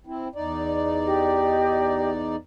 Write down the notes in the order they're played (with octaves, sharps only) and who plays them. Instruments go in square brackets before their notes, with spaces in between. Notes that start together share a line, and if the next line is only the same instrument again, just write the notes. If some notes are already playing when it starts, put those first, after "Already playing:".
[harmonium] C4 E4
E2 D#4 D5
[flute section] G4 D#5